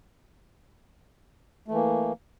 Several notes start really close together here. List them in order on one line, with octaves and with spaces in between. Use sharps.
A3 E3 A#3